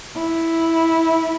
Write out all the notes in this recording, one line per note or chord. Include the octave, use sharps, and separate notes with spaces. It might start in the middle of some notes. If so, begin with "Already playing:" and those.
E4